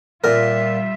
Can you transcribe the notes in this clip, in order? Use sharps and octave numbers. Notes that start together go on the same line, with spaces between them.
A#2 G3 F4 A#4 E5